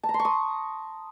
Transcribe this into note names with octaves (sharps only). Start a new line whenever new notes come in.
A5
A#5
C6
C#6
D#6